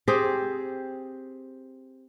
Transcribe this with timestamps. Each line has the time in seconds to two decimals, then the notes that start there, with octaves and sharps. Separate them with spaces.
0.08 C4 G4 G#4 C5